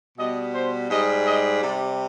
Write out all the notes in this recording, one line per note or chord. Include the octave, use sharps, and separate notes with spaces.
B2 G3 D#5
C5
G#2 G3 D#5
D#5
C3 G3 D5